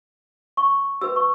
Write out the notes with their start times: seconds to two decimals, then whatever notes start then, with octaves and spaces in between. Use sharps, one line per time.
0.57 C#6
1.01 F#4 B4 E6
1.16 C#6